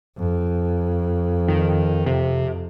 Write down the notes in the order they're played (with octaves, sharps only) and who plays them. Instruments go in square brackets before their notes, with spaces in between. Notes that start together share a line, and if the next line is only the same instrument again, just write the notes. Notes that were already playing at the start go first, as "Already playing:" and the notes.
[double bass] F2
[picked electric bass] D#3
C3